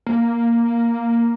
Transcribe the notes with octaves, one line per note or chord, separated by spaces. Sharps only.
A#3